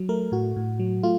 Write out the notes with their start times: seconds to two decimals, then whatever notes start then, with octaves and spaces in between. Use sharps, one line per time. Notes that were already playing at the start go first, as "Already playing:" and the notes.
Already playing: F#3
0.09 A3 A#4
0.32 A2 F#4
0.56 A2
0.79 F#3
1.03 A3 F4